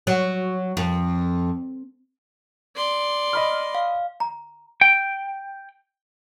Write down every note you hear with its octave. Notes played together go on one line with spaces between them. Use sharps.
F#3
F2
D5 C6
D#5 B5 F6
F5
A#5
G5